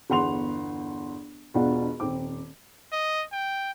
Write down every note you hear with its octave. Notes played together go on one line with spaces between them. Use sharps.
G1 E2 F#5 C6 F7
E1 B2 D4 F4 F#5
D#1 C4 D6
D#5
G5